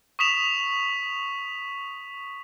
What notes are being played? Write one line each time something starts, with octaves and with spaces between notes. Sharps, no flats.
C#6 D#6 B6 E7 F7